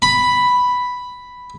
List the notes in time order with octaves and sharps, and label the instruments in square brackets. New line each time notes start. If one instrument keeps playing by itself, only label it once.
[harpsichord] B5